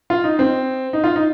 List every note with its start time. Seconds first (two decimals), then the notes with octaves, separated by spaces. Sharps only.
0.10 F4
0.24 D#4
0.39 C4
0.93 D#4
1.04 F4
1.16 D#4